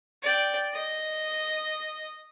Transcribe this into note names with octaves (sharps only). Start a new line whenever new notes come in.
D5 G5
D#5